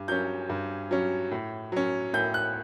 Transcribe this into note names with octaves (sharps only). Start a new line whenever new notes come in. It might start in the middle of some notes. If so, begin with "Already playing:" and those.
Already playing: G2
F#3 C#4 G6
G2
F#3 C#4
A2
F#3 C#4
A2 G6
F#6